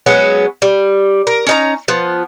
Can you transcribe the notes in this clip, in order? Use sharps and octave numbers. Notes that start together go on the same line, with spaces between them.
F#3 G#3 B3 C#4
G3
A#4
C#4 D#4 A#5
F3 B3